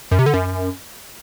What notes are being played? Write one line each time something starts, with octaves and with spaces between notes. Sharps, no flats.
F#2
C3
D3
F#2